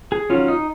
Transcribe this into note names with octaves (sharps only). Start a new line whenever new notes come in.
G#4
D#3 F#3 C#4 F4
D#4